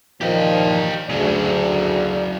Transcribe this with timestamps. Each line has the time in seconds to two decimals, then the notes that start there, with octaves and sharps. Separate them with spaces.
0.21 A#2 D#3 F3 G4 D#5
1.10 D2 C#3 F#3 G#4 D5